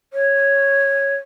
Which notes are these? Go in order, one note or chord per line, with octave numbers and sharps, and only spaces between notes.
C#5